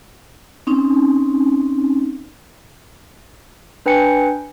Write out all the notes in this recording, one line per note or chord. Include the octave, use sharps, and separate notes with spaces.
C4 C#4 D#4
D4 B4 G5 G#5 C#7